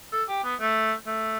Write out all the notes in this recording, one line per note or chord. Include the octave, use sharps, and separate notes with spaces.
A4
G4
B3
A3
A3